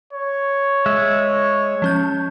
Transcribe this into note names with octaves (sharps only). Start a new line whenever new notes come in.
C#5
G#3 E5
F3 C#4 G6